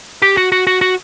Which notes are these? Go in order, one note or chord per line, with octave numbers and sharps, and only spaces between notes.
G4
F#4
F#4
F#4
F#4